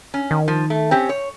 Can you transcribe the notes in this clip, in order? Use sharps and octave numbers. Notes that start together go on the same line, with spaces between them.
C#4
D#3
F3
A3
C4 C#4 G4
C#5